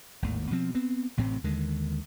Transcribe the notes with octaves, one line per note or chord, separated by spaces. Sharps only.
G#1 D#2 A2
B2 F3 C4
B3 C4
A1 A2 C3 C4
D#2 D3 D#3 G#3